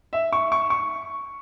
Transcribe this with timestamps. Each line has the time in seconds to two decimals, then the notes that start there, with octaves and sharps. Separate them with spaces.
0.13 E5
0.33 C#6
0.52 C#6
0.70 C#6